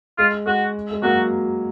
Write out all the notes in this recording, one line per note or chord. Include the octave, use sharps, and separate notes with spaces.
G#3 F4
G#3 F#4
G#3
F#3 A#3 F#4